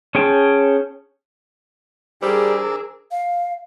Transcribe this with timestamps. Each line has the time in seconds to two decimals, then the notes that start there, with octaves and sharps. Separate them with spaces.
0.15 C#4 G#4 G5 A5
2.23 G3 D4 G#4 A#4 C5 D6 E6
3.11 F5